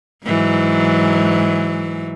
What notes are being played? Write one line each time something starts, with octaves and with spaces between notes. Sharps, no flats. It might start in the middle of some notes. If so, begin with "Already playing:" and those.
G#2 E3 F#3